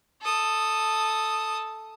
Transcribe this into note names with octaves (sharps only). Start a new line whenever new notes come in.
A4 D#6